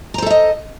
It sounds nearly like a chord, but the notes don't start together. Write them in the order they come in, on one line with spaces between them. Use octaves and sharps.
A#5 C5 A4 E5 D#5